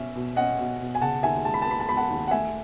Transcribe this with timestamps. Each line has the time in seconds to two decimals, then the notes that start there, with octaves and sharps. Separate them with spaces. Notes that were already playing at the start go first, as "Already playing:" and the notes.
Already playing: B2 C#4 E5
0.16 B2
0.36 C#4 D#5 F#5
0.59 B2
0.81 B2
0.95 G#5
1.01 C#3 F#5 A5
1.23 D#2 E5 G#5
1.45 G#3 A5
1.54 B5
1.62 A5
1.67 B3 B5
1.80 A5
1.88 G#3 B5
1.97 F#5 A5
2.10 D#2
2.28 F#5
2.31 A3 E5 G#5